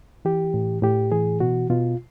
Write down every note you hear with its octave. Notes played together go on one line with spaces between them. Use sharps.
E3 G4
A2
A2 G4
E3 G#4
B2 F#4
B2 F4